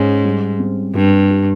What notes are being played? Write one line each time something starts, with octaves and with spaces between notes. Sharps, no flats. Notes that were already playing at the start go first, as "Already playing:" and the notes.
Already playing: G#2 C#4
G3
C4
G2 G3
G4